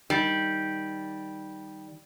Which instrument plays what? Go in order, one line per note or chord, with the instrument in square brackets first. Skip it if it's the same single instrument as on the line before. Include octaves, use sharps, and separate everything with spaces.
[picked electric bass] D#3 [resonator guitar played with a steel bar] G3